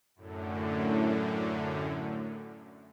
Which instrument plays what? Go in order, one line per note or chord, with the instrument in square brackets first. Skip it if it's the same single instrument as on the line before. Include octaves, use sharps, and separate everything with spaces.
[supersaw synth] F#2 A2 D3